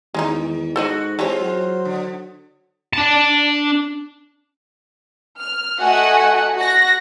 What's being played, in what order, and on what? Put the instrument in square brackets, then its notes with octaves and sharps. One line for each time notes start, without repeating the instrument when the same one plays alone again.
[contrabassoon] E2 [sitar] D#3 [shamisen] G#3 C#4 D#4
[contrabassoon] G#2 [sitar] F#4 [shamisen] A4 C5 D#5
[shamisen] E3 G4 C#5 [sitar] G#3 C4 F4 [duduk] C5
[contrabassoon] F#3
[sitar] D3
[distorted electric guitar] D4 A5
[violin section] F6
A3 F#4 D#5 F#5 G#5
F#4 A#6